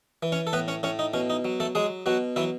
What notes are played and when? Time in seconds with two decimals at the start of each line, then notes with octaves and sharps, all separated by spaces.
0.23 E3
0.32 C#4 C#5
0.47 A4
0.53 A2 B3 B4
0.68 C#4 C#5
0.83 A2 C#4 C#5
0.99 D#4
1.14 B2 C#4
1.30 D#4
1.45 F#3
1.60 A3 A4
1.75 F#3 G#3 G#4
2.06 B2 F#3 F#4
2.36 E3 F#3 E4